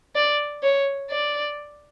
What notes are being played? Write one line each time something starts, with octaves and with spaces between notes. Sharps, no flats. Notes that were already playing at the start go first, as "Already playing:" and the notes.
D5
C#5
D5